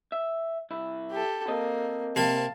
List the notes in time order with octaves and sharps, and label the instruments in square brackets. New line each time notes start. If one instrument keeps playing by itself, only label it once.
[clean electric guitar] E5
C2 E4
[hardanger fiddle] G4 A4
[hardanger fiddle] A#3 [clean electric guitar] C4 D#5
[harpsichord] C3 A#3 B5 [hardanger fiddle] F5 A5